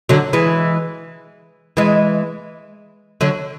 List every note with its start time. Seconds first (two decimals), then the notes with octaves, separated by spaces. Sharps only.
0.09 D3 F#3
0.33 E3 G#3
1.77 E3 G#3
3.21 D3 F#3